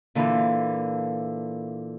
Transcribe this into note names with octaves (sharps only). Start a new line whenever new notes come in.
A#2 D3 E3